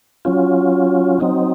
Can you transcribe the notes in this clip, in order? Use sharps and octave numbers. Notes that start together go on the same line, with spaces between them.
F#3 C#4 F4
F#3 C4 D#4